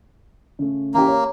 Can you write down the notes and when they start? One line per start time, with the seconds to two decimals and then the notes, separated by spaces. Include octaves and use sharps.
0.59 C#3 A3
0.94 E3 A#3 C#4 G4
1.08 C#5